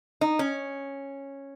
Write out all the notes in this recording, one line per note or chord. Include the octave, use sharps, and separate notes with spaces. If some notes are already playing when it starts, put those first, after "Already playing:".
D#4
C#4